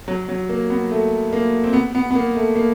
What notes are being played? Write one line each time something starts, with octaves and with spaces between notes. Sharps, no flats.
F#3
F#3
A#3
B3
A3
A#3
C4
B3
B3
B3
A#3
A3
A#3